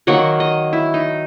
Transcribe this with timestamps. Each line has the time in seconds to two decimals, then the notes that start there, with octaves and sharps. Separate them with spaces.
0.07 D#3 F#3 A#3 F#5
0.40 D#5
0.73 E4
0.94 D#4